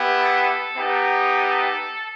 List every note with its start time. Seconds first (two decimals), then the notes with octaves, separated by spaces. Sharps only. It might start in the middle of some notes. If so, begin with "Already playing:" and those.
Already playing: B3 E4 G4
0.18 A4
0.76 B3 D#4 G4
1.34 A4